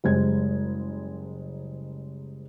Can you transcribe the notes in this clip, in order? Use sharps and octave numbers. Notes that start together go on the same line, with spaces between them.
F#1 G3 G#3 C5 G#6